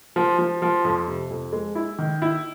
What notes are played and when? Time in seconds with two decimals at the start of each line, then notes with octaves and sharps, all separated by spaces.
0.16 F3
0.39 F3
0.62 F3
0.85 F2
1.07 C3
1.30 F2
1.53 G#3
1.75 E4
1.99 D#3
2.22 E4